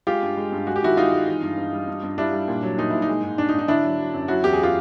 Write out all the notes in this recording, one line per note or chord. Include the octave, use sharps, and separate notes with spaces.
G#3 F4 G4
G2
G#3
G2
G#3 F#4
G4
D#3 E4 F#4
G#3 D#4 F4
G#3
E3
G2
G2
G3
G2
G2
G3 D4 E4
G3
A#2
F#3
A#2 D#4
A#2 E4
D#4
G#3
G#2
G#2 D4
D#4
G#2
D#4
D3 D4 E4
F#3
F#3
F#2
F#3 E4 F#4
E2 G4
G#4
F4 G4